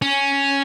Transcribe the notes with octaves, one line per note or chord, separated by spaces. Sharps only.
C#4